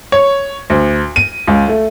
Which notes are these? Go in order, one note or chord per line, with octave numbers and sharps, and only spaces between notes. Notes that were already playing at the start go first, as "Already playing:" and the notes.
C#5
D2
D#7
C#2
A3